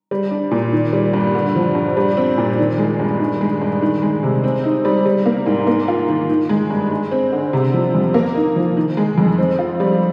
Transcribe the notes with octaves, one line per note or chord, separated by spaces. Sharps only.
G3
D4
A#2
D#3
G3
G2
D3
F3
G2
G3
C4
A#2
D#3
G#3
G2
D#3
G#3
G2
D#3
G#3
C3
C4
D#4
G3
G3
A#3
G#2
A#3
F4
D#3
D#3
G#3
G2
G#3
C4
D3
C3
F3
F2
A#3
D#4
F3
D#3
G#3
F2
C4
F4
G3